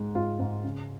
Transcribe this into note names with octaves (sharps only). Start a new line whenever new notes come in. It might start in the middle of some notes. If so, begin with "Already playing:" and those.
Already playing: G#2 G#3
G#2 F4
G#2
C#3